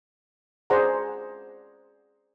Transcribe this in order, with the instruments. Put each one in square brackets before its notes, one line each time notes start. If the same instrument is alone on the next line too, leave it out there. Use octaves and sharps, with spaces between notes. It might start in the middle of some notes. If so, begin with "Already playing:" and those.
[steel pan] G#4 C5 D5 F#5 A#5